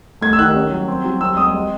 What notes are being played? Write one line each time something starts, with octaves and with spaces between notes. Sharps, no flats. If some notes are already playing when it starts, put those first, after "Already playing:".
A3 G#6
E6
D#3 F#6
C#4
F#3
C4
F#3
C4 E6
G#3 D#6
G#3